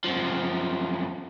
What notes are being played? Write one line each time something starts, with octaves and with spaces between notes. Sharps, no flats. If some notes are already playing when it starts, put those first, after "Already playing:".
F#2 F3